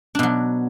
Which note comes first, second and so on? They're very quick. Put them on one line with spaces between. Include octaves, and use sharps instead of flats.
D4 B2 F#3